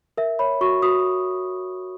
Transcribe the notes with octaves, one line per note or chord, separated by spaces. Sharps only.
A#4 E5
C#5 B5
F#4 C#6
F#4 D#6